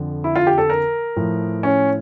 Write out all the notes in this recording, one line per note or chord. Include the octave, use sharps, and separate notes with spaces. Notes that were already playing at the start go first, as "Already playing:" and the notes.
Already playing: F2 D3 F3
E4
F4
G4
A4
A#4
A2 F3
C#4